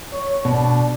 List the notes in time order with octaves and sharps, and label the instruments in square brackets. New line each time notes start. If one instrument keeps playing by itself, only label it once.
[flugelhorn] C#5
[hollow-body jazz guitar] B2 [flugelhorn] D4